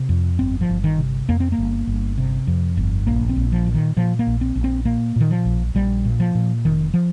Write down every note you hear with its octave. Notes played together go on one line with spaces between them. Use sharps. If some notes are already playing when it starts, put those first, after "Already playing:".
Already playing: C3
F2
G1 C4
F3
G1
D#3
C3
F2 A#3
C4
A#3
G1
G1
C3
F2
G1
A#1 A#3
C4
A#1
F3
A#2
D#3
A#2 F3
A#3
A#1
C4
A#1
C4
A#2 A#3
A#2 D#3
F3
A#1
A#1 G3
A#2
F3
A#2
F1 D#3
F3